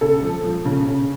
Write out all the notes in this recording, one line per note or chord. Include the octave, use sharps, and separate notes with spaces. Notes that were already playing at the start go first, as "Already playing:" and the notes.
C#3 A4
F3
F3
C#3
C#3